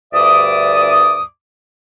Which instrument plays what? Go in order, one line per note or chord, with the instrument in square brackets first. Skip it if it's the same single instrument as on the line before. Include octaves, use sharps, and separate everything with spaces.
[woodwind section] D2 G2 D5 E5 D6 D#6